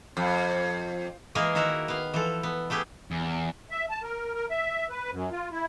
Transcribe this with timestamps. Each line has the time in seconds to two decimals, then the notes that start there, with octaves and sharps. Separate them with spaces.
0.17 F2
1.35 E3 G#3 A#3 G#4 A#4 G#5
1.55 D#3 E4 F#4 A#4 E5 F#5
1.88 B3 F5
2.14 E3 F3 A4
2.43 B3
2.70 A3 B3 G4 G#4
3.11 E2
3.71 E5
3.90 A5
4.03 A#4
4.34 A#4
4.50 E5
4.90 B4
5.10 F#2
5.31 F4
5.52 E4